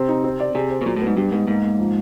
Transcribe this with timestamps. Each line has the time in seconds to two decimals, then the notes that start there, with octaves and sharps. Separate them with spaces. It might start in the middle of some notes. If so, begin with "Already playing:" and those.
Already playing: C3 C4
0.08 D#4
0.24 C4
0.40 D5
0.55 C3 G#4
0.70 C5
0.82 B2
0.86 A#2 F#3
0.96 A2
1.02 G#2 B3
1.17 G2 G3
1.32 G#2 B3
1.47 G#2 A#3
1.63 A#3
1.79 F3